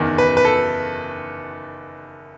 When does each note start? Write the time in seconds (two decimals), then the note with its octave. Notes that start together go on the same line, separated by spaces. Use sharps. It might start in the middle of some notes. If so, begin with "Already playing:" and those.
Already playing: F#1 E2 D#3
0.18 B4
0.37 B4
0.45 A4